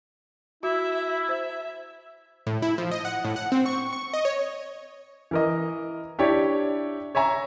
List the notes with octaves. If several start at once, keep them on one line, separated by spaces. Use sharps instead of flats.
E4 F#4 E5
C5 E5
A2
E4
F3
D#5
F#5
A2
F#5
C4
C#6
C#6
D#5
C#5
E3 A#4 D#5
D4 E4 G4 C#5 D5
C#5 E5 G#5 A#5